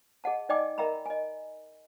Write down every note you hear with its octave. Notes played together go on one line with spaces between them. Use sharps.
G#4 D#5 F#5 A5
D#4 D5 D#5 G5 G#5 D6
A#4 D#5 E5 G5 A#5 B5
D#5 G#5